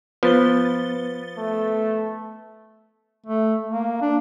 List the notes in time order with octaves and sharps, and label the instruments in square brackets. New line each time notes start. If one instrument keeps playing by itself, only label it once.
[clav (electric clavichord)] F3 [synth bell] B3 A6 G7 [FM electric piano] B4
[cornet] A3
[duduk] A3
A#3
D4